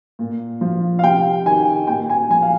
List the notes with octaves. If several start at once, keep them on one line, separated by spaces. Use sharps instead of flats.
A#2
F3
F5
C3 G5
D#3 G#5
A#2 G5
G#5
F3 G#5
F5